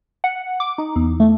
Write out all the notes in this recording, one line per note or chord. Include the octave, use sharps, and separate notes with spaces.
F#5
D6
D#4
E2
A3